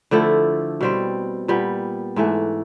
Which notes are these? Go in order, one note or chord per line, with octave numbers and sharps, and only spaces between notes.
D3 F3 A3 E4
B2 G3 C4
A#2 G3 B3
G#2 E3 A3